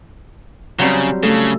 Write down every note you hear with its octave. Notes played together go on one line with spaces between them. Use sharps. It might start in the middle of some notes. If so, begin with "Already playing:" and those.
C#3 F#3 G3 C4
C#3 A3 A4